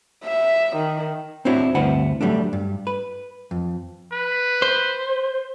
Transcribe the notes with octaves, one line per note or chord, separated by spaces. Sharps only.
E5
D#3
C4 D4 E4 F#4 C#5
D2 G2 C4 E4 B4 F#5
F#3 G3 A3 D4
G2
B4
F2
B4
C5